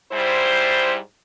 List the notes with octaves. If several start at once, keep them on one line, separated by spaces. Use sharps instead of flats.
G#2 G3 E4 C5